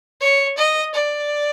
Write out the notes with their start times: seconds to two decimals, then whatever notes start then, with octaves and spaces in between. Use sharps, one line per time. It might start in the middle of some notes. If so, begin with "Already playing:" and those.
0.20 C#5
0.57 D#5
0.93 D5